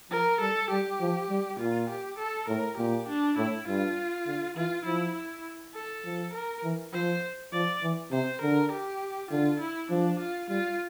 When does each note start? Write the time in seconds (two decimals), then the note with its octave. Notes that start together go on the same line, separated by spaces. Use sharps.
0.11 F3 A#4
0.40 G3 A4
0.71 G3 G4
1.01 F3
1.30 G3
1.59 A#2 F4
1.90 G4
2.19 A4
2.48 A2 A#4
2.78 A#2 G4
3.08 D4
3.38 A2 E4
3.67 G2 F4
4.27 D3
4.56 E3 F4
4.85 F3 E4
5.16 E4
5.75 A4
6.05 F3
6.34 A#4
6.64 E3
6.93 F3 C5
7.53 F3 D5
7.83 E3
8.12 C3 C5
8.42 D3 A#4
8.72 G4
9.31 D3 F4
9.60 E4
9.90 F3 D4
10.20 F4
10.49 G3 F4